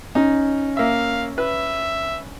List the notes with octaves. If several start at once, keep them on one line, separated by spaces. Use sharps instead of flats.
C#4 D#4
A#3 E5 F5
B4 E5